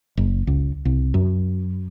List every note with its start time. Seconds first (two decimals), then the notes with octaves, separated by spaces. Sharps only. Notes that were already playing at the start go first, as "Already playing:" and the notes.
0.17 F#1
0.47 C#2
0.85 C2
1.14 F#2